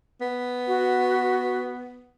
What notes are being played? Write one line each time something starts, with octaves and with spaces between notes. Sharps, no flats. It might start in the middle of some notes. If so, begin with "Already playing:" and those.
B3
F#4